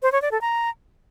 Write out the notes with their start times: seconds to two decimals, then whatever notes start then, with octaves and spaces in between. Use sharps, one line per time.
0.03 C5
0.12 C#5
0.22 D5
0.32 A4
0.41 A#5